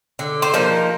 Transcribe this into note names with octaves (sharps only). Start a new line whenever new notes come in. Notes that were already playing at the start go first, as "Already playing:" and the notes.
D3
C5
F3 A#3 D#4